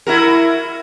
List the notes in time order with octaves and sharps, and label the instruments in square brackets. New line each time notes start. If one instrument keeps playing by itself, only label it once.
[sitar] E4 F#4 A#4